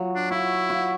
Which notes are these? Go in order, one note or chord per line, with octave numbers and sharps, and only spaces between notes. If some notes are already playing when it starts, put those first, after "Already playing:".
Already playing: F#3 F#4
D4
E4 F#4
F#4